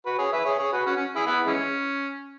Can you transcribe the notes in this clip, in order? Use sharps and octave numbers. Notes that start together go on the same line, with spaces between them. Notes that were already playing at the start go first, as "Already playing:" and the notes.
F#4 B4
G#4 C#5
B4 E5
G#4 C#5
G#4 C#5
F#4 B4
C#4 F#4
C#4
E4 G#4
B3 E4
E3 G#3 C#4